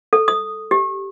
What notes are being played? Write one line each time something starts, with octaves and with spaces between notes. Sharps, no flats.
A4
D#6
G4